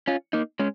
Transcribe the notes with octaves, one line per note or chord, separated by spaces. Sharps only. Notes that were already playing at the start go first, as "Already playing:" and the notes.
C#4 F4
A#3 D#4
G#3 C#4